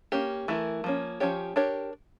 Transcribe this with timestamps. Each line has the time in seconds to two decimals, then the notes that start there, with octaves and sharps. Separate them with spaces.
0.12 A#3 C#4 G4
0.48 E3 A3 E4 A#4
0.84 F3 A#3 C#4
1.20 F3 C#4 G4 C#5
1.56 D4 G4 A#4 C#5